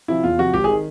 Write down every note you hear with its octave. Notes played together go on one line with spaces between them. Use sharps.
C3 F3 E4
E2 F4
C3 F3 F#4
G#1 G4
G#4
D#3